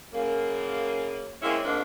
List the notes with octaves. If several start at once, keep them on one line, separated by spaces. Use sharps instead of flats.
F#2 C#3 A#3
G#3 A#3 C4 C#4 E4
F2 G#2 F3 A#3 D4